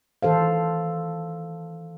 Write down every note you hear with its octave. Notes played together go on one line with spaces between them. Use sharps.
D#3 E3 A4 C5 F5